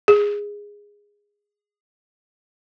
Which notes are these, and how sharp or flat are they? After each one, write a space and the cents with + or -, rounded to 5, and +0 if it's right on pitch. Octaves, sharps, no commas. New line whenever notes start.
G#4 -10